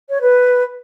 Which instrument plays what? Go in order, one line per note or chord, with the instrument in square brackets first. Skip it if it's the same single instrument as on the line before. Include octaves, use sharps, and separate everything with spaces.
[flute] C#5
B4